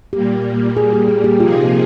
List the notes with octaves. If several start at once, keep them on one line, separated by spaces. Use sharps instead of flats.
A#2 G3 A#3 G4
G#4
G4
G#4
G4
C3 F3 A#3 D#4 F4 G#4